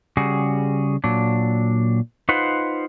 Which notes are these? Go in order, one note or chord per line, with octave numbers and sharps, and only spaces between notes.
C#3 G3 F#4 G#4
A#2 F#3 D4
D#4 F4 B4 C5 F#5